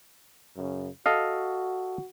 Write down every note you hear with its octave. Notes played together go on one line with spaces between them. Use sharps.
F#2 C#3
F#4 A4 D#5 F5